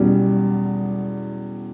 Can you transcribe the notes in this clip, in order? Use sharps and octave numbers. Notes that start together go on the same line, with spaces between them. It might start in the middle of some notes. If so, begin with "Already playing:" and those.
Already playing: E2 B2 G3 C#4